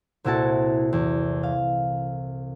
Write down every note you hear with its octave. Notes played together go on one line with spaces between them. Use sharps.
C2 A#2 E4 F#4 A4 A5
E2
F5